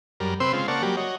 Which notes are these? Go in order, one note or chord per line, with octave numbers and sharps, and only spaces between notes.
F#2 G3 A#4
C3 C4 B4 C5 C6 E6
C#3 G#3 C4 F4
C#3 A#3 D5 F#5 A5 C#6
F#3 G3 A#3 G4
F#4 C#5 D#5